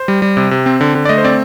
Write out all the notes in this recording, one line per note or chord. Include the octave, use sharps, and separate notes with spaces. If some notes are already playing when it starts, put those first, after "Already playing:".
Already playing: C5
G3
G3
C3
C3
C4
D3
D3
D5
A3 D#5
C5
C4 D5